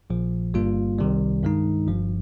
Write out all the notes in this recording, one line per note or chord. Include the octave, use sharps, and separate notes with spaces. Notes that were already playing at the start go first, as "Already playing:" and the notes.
A#1 A#2 F3
G1 G2 G3 A#3 F4
C2 C3 D#3 G3
G2 D#3 G#3 D#4
G1 G2 F3